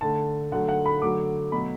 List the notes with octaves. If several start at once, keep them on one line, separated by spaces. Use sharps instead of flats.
D3 A3 A5
D3 F#3 A3 F#5
F#5
B5
D3 F#3 A3 D6
B2 F#3 A3 B5